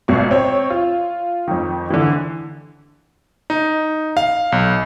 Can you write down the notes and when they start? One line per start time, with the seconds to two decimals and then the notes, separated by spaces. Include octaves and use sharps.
0.08 G#1 B2 C#6
0.31 C4 C#5
0.70 F4
1.48 F2 D#3
1.90 D3 E3
3.50 D#4
4.17 F5
4.52 B1